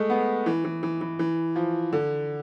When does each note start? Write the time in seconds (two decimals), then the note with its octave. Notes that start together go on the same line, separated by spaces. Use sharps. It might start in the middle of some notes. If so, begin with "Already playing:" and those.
Already playing: G#3 A3
0.10 B3
0.46 E3
0.65 E3
0.83 E3
1.01 E3
1.19 E3
1.56 F3
1.93 D3